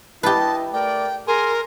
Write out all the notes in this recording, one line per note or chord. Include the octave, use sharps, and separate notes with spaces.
E4 G4 B4 D#5 A5
A3 A#4 D5 G5
G#4 A#4 G#5 C6